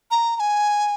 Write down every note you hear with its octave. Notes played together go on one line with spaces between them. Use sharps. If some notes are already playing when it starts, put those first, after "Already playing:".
A#5
A#5
G#5